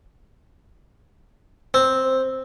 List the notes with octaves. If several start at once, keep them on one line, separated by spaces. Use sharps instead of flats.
C4